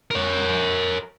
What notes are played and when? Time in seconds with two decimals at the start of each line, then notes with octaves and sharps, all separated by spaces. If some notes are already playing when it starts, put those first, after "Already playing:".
0.11 A#4 C#5